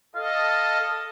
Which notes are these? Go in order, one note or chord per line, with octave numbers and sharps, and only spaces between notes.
A4 D#5 F5